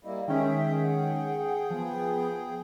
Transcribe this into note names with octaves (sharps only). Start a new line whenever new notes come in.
G3 A#3 E4 D#5
D#3 G#3 C#4 G#4 E5 G5
F#5
F3 B3